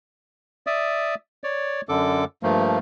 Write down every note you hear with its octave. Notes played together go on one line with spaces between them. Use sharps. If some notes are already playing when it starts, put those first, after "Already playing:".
D5 E5 D#6
C#5 D5
F#2 D3 A4 D6
G2 F3 A3 A#3